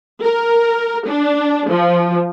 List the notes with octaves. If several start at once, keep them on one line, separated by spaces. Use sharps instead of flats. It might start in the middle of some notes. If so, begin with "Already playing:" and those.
A#4
D4
F3